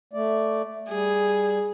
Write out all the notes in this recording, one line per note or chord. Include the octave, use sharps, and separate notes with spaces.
A3 D5
G3 G#4